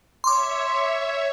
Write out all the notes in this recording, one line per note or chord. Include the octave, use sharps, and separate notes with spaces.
C#5 E5 C6 D6